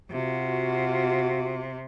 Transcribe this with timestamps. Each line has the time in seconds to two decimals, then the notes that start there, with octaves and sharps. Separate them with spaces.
0.11 C3 F4 F#4